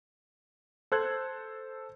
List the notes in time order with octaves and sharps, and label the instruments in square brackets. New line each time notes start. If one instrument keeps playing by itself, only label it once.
[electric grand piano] A4 C5 F#6 G#6